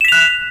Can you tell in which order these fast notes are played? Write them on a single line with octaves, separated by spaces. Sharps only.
E7 B6 F7 F#6